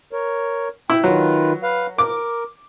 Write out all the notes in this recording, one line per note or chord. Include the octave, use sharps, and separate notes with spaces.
A#4 C#5
E4 G5
D#3 F#3 F4 B4
B4 F5
A#4 D6